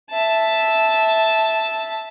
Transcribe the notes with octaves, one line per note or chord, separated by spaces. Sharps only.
E5 A5